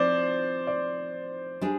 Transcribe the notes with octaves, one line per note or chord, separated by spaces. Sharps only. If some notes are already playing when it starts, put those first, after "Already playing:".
Already playing: F3 C4 F4 C5 D5
D5
G3 D4 G#4